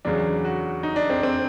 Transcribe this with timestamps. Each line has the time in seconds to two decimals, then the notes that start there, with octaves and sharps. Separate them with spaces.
0.05 E2 C#3 F#3 D4
0.45 F#4
0.83 D#4
0.96 D4
1.10 C4
1.23 C4